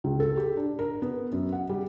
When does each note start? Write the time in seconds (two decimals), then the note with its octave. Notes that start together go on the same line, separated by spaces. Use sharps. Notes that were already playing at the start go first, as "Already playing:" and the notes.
0.04 C#2
0.20 A4
0.37 G4
0.57 D4
0.79 A#4
1.02 B3
1.32 F#2
1.52 F#5
1.69 G3